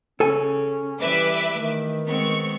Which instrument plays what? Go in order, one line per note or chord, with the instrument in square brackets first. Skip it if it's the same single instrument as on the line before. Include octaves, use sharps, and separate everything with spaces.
[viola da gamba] C#3 [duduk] C#4 [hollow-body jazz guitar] A4 G#5
[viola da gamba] E3 G3 [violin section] B4 E5 D6
[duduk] D#3 [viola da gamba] A3
[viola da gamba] G#3 B3 C4 [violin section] C#6